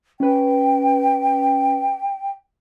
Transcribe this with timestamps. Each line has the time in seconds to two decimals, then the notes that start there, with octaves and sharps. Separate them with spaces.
0.20 C#4 B4 G5